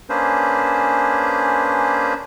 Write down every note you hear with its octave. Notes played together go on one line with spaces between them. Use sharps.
A#3 C#4 D4 G#4 B4 C5